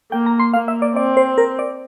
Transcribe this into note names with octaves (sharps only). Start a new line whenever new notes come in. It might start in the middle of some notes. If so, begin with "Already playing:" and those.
A#3 G5
A#5
C6
A#3 F5
E5
D5
C4 D5
C5
A#4
D5